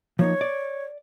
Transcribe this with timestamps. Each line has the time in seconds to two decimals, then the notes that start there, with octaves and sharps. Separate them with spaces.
0.19 F3 A#3 D#4 C#5
0.41 D5